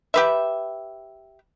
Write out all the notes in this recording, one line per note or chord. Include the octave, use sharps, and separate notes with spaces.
G4 B4 E5